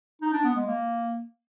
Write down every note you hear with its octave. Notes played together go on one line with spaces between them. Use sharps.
D#4
D4
B3
G#3
A#3